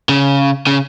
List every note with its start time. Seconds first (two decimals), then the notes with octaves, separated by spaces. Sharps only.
0.09 C#3
0.67 C#3